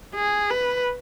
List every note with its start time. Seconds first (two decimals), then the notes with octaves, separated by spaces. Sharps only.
0.15 G#4
0.50 B4